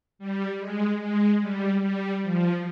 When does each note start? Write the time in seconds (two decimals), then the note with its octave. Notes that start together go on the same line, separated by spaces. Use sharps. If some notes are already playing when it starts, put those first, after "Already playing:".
0.19 G3
0.60 G#3
1.01 G#3
1.41 G3
1.82 G3
2.23 F3